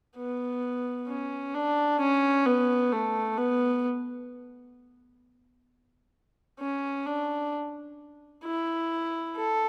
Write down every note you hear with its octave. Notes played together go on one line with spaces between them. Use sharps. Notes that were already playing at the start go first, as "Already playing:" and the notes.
B3
C#4
D4
C#4
B3
A3
B3
C#4
D4
E4
A4